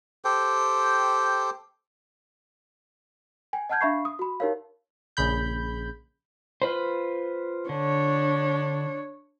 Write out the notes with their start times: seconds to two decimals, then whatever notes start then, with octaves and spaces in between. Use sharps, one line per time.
0.25 G4 A4 C5 G5
3.53 G5 G#5
3.69 D#5 F#5 A5 F6 G6 G#6
3.81 D4 E5 F5 B5 C#6 C7
4.05 D#6
4.19 F#4 B5
4.40 D#4 G4 A#4 C#5 F5
5.17 A#1 C#3 B5 G6
6.62 F4 B4 C5
7.69 D3 D4 C#5